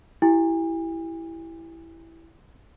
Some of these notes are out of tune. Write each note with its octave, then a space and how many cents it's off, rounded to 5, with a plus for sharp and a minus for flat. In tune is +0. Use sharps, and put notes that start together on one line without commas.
E4 +0 G4 -25 G#5 -40